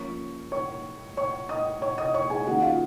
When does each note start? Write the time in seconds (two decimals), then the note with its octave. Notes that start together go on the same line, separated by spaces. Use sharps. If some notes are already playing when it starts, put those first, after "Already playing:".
Already playing: F3 A#3 C#4 C#5 C#6
0.52 C#5 C#6
1.17 C#5 C#6
1.49 D#5 D#6
1.82 C#5 C#6
1.98 D#5 D#6
2.14 C#5 C#6
2.30 G#4 G#5
2.46 D#3 A#3 C#4 F#4 F#5
2.62 F4 F5